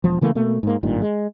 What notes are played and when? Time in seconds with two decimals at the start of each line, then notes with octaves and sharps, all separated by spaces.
0.04 E1 F3
0.21 C#3 E3 A3 A#3
0.35 B2 A3 A#3
0.63 G#2 A#3
0.83 G#1 G2 A#2 D#3
1.02 G#3